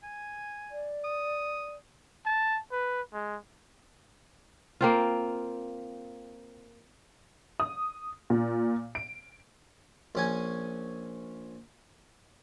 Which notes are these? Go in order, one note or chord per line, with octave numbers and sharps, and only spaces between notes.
G#5
D5
D#6
A5
B4
G#3
A#3 C4 F4
D#6
A#2
D7
A#1 C#4 G#5